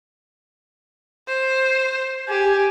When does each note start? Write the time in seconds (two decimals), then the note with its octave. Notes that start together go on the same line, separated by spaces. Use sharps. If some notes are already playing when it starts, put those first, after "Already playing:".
1.28 C5
2.29 G4 G#5